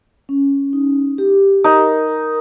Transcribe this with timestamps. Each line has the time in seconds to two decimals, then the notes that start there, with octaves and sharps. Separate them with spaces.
0.29 C#4
0.73 D#4
1.18 G4
1.64 D#4 A#4
2.09 A#4